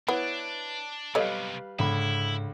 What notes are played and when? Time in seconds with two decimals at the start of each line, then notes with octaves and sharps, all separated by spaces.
0.08 B3 D4 E4 B4 C#5
1.15 B1 C3 G3 A4 B4 C#5 D#5 F5
1.79 C#2 G#2 D3 E4 B5